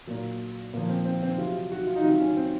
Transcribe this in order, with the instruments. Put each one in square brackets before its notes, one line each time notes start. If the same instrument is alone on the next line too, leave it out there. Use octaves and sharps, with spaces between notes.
[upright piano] A#2 F#3 A#3
A#2 F3 A#3
C4
C4
C4
C3 F#3 F4
F#4
F4
D#4
C3 D#3 F#3 F4
C#4
C4